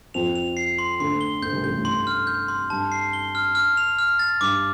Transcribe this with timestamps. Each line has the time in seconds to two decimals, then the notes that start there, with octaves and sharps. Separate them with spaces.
0.14 F2 F3 F7
0.36 F7
0.57 C7
0.79 C6
1.00 D2 D3 C6
1.21 G7
1.42 D2 D3 G6
1.53 C2 C3
1.64 A1 A2 G6
1.74 G2
1.85 C6
2.07 F6
2.27 G6
2.48 C6
2.70 G2 A5
2.92 C7
3.13 G7
3.35 F6
3.55 F6
3.77 F7
3.99 F6
4.19 A6
4.41 G2 D6